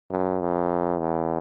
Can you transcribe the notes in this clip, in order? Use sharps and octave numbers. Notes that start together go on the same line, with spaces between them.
F#2
F2
E2